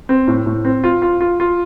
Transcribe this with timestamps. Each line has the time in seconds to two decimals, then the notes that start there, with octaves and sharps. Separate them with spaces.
0.09 C4
0.28 A2
0.46 A2
0.65 C4
0.84 F4
1.02 F4
1.21 F4
1.40 F4